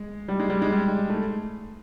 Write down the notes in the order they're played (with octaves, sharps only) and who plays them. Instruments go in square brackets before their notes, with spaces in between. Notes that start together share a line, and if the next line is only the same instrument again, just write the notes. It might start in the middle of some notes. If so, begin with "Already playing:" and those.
Already playing: [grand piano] G#3
G3
G#3
G3
G#3
G3
A3